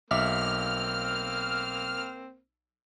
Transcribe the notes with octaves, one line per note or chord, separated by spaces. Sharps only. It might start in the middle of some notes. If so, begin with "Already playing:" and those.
B1 A#3 C4 E5 D6 F6